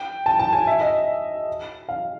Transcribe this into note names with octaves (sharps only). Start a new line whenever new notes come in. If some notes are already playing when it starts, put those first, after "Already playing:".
Already playing: G5
A5
A5
G#5
E5
D#5
F5